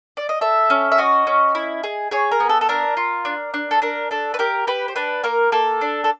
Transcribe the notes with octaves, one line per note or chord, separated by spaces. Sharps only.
D5
D#5
A4 E5
C#4
E5
F#4 D#5
C#4
E4
G#4
G#4 C#5
A#4
B3
A4
A4
D4 A#4
F4
D4
D4
A4
D4 A#4
D4 A4
B4
G4 A#4
G4 B4
C5
D4 B4
A#3 A#4
A#3 A4
D4
A4